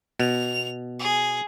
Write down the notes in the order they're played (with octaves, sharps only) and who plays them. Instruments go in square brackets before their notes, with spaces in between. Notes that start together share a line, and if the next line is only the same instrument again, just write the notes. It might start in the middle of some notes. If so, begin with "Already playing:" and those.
[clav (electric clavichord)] B2 [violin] F7
[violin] G#4